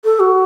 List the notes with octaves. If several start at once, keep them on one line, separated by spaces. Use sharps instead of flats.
A4
F#4